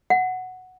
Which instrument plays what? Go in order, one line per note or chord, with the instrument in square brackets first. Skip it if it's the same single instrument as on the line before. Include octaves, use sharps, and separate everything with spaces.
[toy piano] F#5